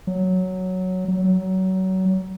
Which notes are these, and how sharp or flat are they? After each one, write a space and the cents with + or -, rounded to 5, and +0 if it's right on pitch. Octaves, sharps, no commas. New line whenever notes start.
F#3 +0
F#3 +25